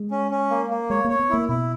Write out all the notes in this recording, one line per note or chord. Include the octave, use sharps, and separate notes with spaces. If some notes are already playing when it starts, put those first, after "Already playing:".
Already playing: G#3
C#4
C#4
A#3
A#3
G#3 C#5
A#3
C#5
B3
A#3 E4
B2 E4